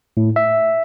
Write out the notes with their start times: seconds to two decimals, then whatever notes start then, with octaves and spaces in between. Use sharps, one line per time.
0.17 A2
0.36 E5